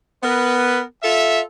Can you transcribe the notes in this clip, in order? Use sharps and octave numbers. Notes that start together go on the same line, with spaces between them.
B3 A#4 B4
F4 A4 E5